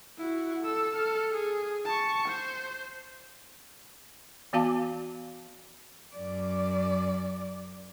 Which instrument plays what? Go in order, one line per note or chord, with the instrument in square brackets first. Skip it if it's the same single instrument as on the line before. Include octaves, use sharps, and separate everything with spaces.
[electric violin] E4 F#4
A4 E6
A4 F6
G#4
A5 C#6
C5
[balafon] E3 B3 F#4 F5 A5 D6
[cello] F#2 D5